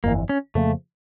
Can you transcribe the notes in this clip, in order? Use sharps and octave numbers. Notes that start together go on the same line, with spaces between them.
G1 F2 E3 A#3
C#4
F2 C#3 F3 A3 A#3